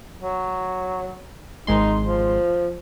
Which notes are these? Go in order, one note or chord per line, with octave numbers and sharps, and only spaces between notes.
F#3
G#1 G#3 D#4 C6
F3